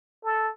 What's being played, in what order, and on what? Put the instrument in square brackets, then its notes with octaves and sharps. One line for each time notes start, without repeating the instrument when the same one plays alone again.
[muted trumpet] A4